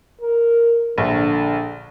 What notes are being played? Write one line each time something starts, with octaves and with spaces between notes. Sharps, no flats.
A#4
A#1 D3